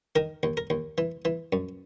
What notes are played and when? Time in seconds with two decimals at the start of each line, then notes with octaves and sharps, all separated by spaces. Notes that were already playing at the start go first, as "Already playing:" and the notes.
0.16 D#3 A#4
0.43 D#2
0.57 A#4
0.70 D#2
0.98 E3
1.25 E3
1.53 F#2